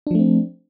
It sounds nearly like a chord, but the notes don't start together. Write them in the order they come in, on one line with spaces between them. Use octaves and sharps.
D4 F3 A3 C4